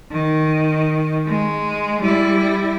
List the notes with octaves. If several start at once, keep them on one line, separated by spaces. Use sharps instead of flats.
D#3
G#3
G3 E4